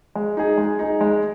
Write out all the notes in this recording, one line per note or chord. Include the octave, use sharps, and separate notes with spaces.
G#3
D#4 G#4
G#3
D#4 G#4
G#3